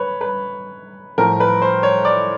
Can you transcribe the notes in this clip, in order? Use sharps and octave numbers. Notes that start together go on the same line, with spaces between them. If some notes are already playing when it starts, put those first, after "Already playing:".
Already playing: B4 C#5
B4
A2 F3 A#4
B4
C5
C#5
D5